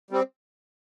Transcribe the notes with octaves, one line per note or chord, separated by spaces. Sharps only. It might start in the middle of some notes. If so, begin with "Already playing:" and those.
G3 C4